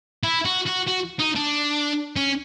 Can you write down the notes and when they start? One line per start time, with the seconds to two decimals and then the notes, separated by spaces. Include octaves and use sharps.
0.23 E4
0.45 F#4
0.66 F#4
0.87 F#4
1.19 D#4
1.35 D4
2.16 C#4